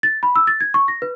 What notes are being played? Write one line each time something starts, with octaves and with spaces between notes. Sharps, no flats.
A6
B5
E6
A6
G#6
C#6
A#6
B4